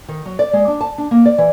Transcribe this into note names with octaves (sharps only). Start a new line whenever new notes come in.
D#3
F#3
D5
G#3
D4
A5
D4
A#3
D5
E3